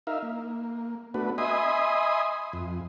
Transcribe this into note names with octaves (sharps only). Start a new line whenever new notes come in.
D#4 A#4 E5 F5
A#3
A3 B3 D4 F#4 B4
D#5 E5 G#5 B5 C6 D#6
F2